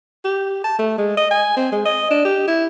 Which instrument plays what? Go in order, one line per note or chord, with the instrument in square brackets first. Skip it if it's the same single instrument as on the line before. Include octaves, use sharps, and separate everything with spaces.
[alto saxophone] G4
A5
A3
G#3
D#5
G#5
C4
G#3
D#5
D4
G4
E4